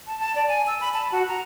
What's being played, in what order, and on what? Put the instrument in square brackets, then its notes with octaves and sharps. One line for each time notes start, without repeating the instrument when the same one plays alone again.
[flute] A5
A5
D5
G#5
E6
B5
A5
F#4
A#5